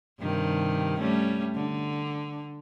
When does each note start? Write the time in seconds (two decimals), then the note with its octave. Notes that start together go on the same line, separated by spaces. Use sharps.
0.20 G2 C3 D#3
0.99 G3 A3 C#4
1.55 D3